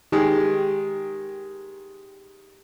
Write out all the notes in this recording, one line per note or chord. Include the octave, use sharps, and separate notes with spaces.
D#3 G#3 G4